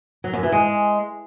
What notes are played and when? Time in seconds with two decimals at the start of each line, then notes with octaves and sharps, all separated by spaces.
0.24 F#3
0.33 F#2
0.43 E3
0.52 G#3